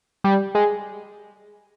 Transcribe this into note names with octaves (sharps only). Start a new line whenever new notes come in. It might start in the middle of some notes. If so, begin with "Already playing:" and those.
G3
G#3